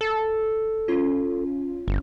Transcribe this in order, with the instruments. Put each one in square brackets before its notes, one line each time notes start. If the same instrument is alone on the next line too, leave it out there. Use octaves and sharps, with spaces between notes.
[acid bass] A4
[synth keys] C#4 F4
[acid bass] G1